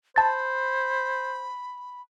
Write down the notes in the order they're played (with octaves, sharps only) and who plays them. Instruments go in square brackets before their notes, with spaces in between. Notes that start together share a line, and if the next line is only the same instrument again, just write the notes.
[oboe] C5 [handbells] A5 A6 [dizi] B5